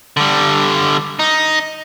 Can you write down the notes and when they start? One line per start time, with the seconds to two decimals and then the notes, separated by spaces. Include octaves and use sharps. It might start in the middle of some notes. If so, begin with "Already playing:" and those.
0.17 D3 G3
1.19 D#4